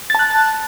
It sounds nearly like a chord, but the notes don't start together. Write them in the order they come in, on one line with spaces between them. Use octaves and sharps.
A6 A5 F#6